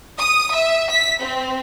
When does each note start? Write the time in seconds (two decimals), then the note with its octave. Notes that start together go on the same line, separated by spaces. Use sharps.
0.19 D#6
0.55 E5
0.91 B6
1.22 C4